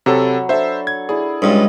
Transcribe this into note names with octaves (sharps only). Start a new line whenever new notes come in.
C3 F#3 A4 B5
D4 A4 C5 E5
G#6
E4 G#4 D5
C#2 G2 F4 D#5